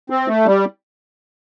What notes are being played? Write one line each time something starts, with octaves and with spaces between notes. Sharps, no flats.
C4
A3
G3